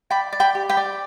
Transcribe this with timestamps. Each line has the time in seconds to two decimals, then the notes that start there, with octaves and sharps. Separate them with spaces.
0.11 D5 G5 B5
0.33 D5
0.40 G5 B5
0.55 G4
0.69 G5 B5
0.77 D5